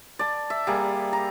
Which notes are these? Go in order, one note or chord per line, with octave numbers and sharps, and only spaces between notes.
D5 A5
E5
G3 A#3 G#4
A#5